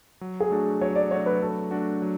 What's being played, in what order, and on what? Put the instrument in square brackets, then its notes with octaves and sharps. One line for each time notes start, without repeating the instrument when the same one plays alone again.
[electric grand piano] F#3
[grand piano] G#4
[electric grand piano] A3 D4 F#4
[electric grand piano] F#3 [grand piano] C#5
[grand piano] D5
[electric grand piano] A3 D4 F#4 [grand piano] C#5
[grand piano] B4
[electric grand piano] F#3 [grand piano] A4
[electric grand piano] A3 D4 F#4
F#3